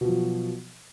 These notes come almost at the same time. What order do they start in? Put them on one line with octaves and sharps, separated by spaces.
B2 F3 F#3